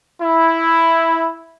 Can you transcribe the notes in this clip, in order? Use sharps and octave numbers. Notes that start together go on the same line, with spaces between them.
E4